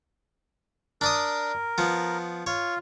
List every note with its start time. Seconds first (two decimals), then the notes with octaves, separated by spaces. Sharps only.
1.01 D4 A#4 D5 D#6
1.78 F3 B3
2.47 F4 C#5